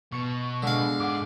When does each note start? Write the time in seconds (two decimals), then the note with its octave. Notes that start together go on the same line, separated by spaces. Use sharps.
0.12 B2 C#6 C#7
0.63 D3 G#3 F5
1.00 G#2 F#5 D6